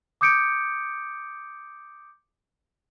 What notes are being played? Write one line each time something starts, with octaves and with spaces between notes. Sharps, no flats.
D6 D#6 G6 C#7 D7